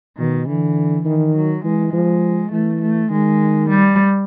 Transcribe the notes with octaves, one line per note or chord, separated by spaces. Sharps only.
B2 D#3
D3 E3
D#3 E3
F#3
E3 G#3
F3 G#3
E3 A3
A3
D#3 G#3
G3